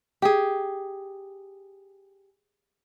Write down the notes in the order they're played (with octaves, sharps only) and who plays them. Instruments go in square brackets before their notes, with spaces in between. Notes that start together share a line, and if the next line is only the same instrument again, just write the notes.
[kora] G4 G#4